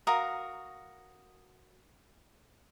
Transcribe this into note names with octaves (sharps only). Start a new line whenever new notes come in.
F#4 A#4 F5 D#6